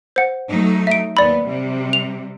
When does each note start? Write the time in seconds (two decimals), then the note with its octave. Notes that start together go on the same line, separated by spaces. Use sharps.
0.16 C5 F#5
0.49 F#3 A3 D#4
0.87 E5 D7
1.17 D#2 B3 D5 B5
1.46 C3 G3
1.93 F7